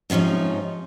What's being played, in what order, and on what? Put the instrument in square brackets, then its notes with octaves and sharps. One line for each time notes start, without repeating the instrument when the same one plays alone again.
[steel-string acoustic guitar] G#2 C3 F3 C#4 D#4